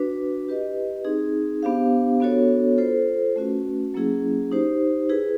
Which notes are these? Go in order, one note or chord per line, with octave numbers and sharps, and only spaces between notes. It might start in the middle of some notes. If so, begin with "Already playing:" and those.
Already playing: D4 F#4 B4
E4 G4 B4 D#5
C4 D#4 G#4
B3 D4 G4 C5 F5
B3 D4 F#4 A4 C#5
F4 A4 C5
A3 C#4 F#4 B4
F#3 A#3 C#4 E4 G#4
D#4 G4 C5
E4 G#4 B4